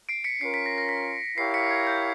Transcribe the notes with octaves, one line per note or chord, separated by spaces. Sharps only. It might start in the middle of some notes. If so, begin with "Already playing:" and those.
C7 D7
B6 C#7
C#4 F4 A#4 C7
B6
A#6
A#6
B6
E4 G4 A#4 C#5 F5 C7
B6 C#7
G#6
G6